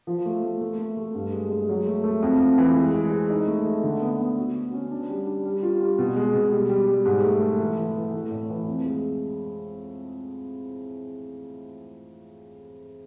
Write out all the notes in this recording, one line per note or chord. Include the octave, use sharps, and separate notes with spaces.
F3
A3
A3
A3
A3
A3
G2
G#3
G#3
F#3
A3
A3
F2
F2
E3
G#3
G#3
G#3
D#4
A3
A3
D3
B3
B3
F#4
F#4
C#4
D4
G3
D4
G3
F4
G3
B2
G#3
B2
G3
G3
G3
G#2
A3
A3
E3
E3
E3
A3
A2
E3
F2
G#3